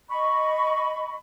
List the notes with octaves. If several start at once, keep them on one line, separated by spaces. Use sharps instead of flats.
D#5 B5 C#6